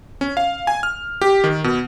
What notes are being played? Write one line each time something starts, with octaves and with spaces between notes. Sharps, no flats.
C#4
F5
G#5
F6
G4
D#3
B2